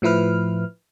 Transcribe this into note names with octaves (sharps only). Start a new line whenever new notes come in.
A2 F3 E4 B4 F6